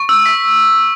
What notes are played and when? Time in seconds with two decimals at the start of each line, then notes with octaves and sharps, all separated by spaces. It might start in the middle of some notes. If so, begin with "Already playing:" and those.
Already playing: C#6
0.09 E6
0.26 B6